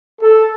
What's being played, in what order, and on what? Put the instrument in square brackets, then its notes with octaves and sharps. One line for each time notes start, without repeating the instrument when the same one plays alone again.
[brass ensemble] A4